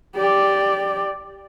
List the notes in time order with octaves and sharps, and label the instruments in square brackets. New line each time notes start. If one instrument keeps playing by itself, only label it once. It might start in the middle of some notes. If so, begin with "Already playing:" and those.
[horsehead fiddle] G4 D5